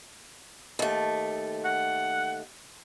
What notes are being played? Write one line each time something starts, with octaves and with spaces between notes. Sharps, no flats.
D#2 A3
F#5